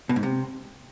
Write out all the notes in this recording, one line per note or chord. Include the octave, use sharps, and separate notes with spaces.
B2
G#2
C3